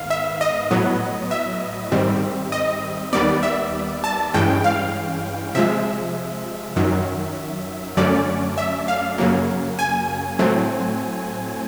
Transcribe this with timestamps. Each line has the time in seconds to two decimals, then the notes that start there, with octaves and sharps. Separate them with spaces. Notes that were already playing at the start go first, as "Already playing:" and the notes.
Already playing: G#2 D#3 B3 F5
0.10 E5
0.41 D#5
0.71 A2 F#3 B3
1.31 E5
1.92 G#2 D#3 G3 C4
2.52 D#5
3.13 D#2 D#3 G3 B3 D5
3.43 E5
4.04 A5
4.34 G2 E3 G#3 C#4 G5
4.64 F5
5.55 C3 F3 G#3 E5
6.76 F#2 D#3 F#3
7.97 F#2 D3 F#3 A3 C#4 D5
8.58 E5
8.88 F5
9.18 F#2 C#3 F#3 A#3
9.79 G#5
10.39 A2 F#3 A3 C4